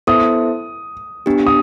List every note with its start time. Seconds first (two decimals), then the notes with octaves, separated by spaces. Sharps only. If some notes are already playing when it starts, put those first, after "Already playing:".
0.07 B3 E4 A4 C5 E5 D#6
1.26 B3 D4 G4
1.47 D#6